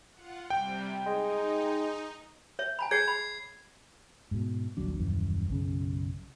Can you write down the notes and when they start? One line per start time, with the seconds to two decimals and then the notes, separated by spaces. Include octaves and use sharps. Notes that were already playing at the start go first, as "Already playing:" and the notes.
0.13 F4 F#5
0.50 C3 G3 G5
1.06 G#3 D#4
2.59 C#5 E5
2.79 G#5 A#5 B5
2.91 G#4 C#5 G#6 C7
3.08 B5
4.31 G#2 B2
4.77 D#1 A#1 F#3 D4
4.99 D#1 F#2 E3
5.48 B1 F#2 C#3